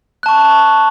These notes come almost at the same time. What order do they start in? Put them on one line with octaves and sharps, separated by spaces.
F#6 A5 C#6